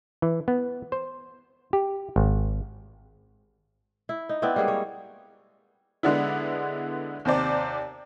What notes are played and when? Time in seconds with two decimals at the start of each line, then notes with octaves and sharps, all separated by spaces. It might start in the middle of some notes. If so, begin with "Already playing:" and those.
0.22 E3
0.48 B3
0.92 C5
1.73 G4
2.16 G#1
4.09 E4
4.29 D#4
4.42 B3 C4 E4 D5
4.56 G3 G#3 A#3 G#4
4.68 C#5
6.03 D3 G#3 B3 D4 E4
7.25 D#2 C3 C5 D5